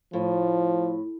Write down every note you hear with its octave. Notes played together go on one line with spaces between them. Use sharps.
A2 F3